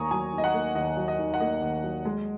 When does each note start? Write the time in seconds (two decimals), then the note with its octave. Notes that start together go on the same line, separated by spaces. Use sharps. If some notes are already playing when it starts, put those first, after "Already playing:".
Already playing: D#2 D#3 A#3 G#5 A#5 C#6 D#6
0.11 F#3 G#5
0.33 D#3
0.38 D#5
0.44 F#5
0.54 A#3
0.75 D#2 D#5
0.97 F#3
1.08 D#5
1.19 D#3
1.34 F#5
1.40 A#3 D#5
1.62 D#2
1.83 F#3
2.05 G#3